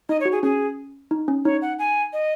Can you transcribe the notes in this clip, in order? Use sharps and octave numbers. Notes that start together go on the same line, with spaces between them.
D#4 D#5
C#5
F#4
G#4
C#4 G#4
D#4
C#4
D#4 C#5
F#5
G#5
D#5